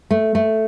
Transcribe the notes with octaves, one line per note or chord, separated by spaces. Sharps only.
A3
A3